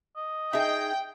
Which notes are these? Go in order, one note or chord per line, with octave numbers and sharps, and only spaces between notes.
D#5
D#4 G#4 E5 G5